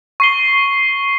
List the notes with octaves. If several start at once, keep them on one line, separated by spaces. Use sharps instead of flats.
C#6 C7 G7